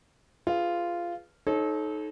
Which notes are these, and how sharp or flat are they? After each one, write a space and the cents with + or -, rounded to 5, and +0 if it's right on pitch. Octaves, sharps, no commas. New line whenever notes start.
F4 -10 G#4 +0 B4 +0
D#4 +0 A4 -30 C#5 -35